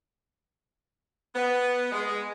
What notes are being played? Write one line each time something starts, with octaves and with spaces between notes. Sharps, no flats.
B3
G#3